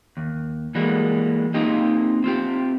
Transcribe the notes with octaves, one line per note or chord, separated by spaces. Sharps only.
D#2
E3 G3 G#3 A#3 F#4
A#3 C4 D#4 F4 G4 D#5
C4 F4 G4